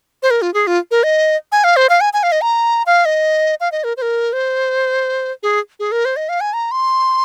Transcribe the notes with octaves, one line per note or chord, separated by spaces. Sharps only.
C5
A#4
F4
G#4
F4
A#4
D#5
G#5
F5
C5
F5
G#5
G#5
F5
D#5
A#5
F5
D#5
F5
D#5
A#4
C5
A#4
C5
G#4
G#4
A#4
C5
D#5
F5
G#5
A#5
C6